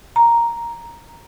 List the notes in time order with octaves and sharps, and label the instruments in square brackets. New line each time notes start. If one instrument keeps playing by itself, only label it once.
[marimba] A#5